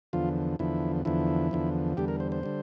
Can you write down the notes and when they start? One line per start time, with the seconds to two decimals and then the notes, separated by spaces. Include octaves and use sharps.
0.13 E2 D3 F3 F4
0.59 E2 D3 F3 E4
1.05 E2 D3 F3 E4
1.51 E2 D3 F3
1.97 E2 D3 G3 G4
2.08 A#4
2.20 C5
2.32 C5
2.43 D3 G3